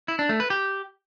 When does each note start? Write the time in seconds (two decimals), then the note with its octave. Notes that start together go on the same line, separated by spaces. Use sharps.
0.08 E4
0.19 D4
0.29 A3
0.40 B4
0.50 G4